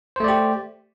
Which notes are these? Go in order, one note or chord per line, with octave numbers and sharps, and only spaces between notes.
A3 G4 C5 D5